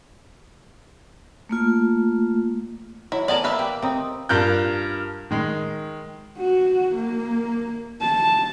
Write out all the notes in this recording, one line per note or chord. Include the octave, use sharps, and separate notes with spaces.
A3 A#3 F4
F#3 E4
B3 A#4 D5 G#5 A5
A#3 B4 E5
G4
C4 D#4
G2 F4 A#4 F#6 G6
D#3 G#3
F#4
A#3
A5